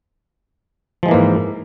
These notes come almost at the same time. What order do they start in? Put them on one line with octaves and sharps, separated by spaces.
F3 G#3 E3 A#3 G#2